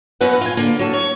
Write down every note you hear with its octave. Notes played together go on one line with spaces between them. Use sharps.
F#2 F#3 B3 B4 F#5
F4 G#5
D3 A#3
F#3 A4
C#5